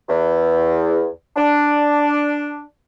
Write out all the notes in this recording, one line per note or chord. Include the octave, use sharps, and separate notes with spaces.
E2
D4